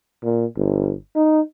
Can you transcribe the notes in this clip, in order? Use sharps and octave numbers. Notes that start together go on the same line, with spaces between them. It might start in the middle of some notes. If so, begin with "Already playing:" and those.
A#2
G1
D#4